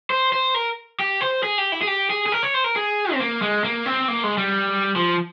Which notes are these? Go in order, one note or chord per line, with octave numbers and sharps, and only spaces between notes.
C5
C5
A#4
G4
C5
G#4
G4
E4
G#4
G4
G#4
G#4
A#4
C#5
C5
A#4
G#4
C4
A#3
G#3
A#3
C4
A#3
G#3
G3
F3